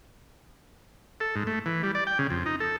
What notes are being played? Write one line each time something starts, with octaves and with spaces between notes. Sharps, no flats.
A4
G#2
A3
E3
G3
D5
G5
C#3
F2
D#4
A4